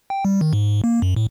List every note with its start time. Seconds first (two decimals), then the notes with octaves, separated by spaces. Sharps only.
0.10 G5
0.25 G3
0.41 D#3
0.53 G#2
0.84 A#3
1.02 F#2
1.16 A2